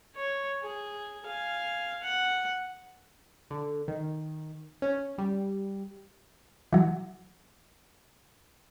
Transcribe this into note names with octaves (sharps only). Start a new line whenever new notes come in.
C#5
G#4
F5 G#5
F#5
D3
D#3
C#4
G3
E3 F#3